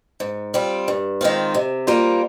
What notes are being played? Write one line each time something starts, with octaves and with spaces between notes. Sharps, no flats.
G#2
G3 C4 F4
G2
D#3 G#3 C4 F4
C3
G3 A#3 F4 C5